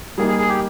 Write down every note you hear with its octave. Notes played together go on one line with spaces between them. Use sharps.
G3 A#3 D#4 G#4
G#4
G#4
G4